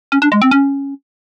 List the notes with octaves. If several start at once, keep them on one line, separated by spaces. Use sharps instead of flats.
C#4
D4
G#3
C4
C#4